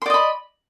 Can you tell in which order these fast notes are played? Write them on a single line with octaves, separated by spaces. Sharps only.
C6 D5 D#5 B5